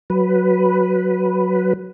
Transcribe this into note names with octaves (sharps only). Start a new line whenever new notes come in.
F#3 B4